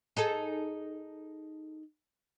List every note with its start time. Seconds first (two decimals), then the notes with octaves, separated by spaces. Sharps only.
0.17 D#4 G#4 A4